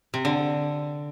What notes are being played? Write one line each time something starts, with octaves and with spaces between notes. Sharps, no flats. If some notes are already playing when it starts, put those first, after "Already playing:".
C3
D3